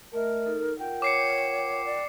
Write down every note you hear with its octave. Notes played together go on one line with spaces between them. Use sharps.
A3 A#4 D#5 E5
D#4 A4
F4 A#4 F#5 G5
C#5 D6 C7 C#7
D5